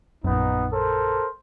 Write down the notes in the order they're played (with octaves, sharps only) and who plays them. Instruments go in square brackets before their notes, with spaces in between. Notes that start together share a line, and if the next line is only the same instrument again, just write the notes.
[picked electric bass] A#1 F#2 [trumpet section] B3 D#4
[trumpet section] A4 A#4 C5